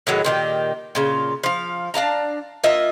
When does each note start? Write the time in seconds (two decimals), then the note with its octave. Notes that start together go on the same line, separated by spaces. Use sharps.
0.07 A2 D#3 F#3 G#3
0.25 A#2 D#3 G4
0.95 A#2 C#3 F4
1.44 F3 F5
1.94 D4 F5 A5 A#5
2.64 A#3 F4 D#5 E5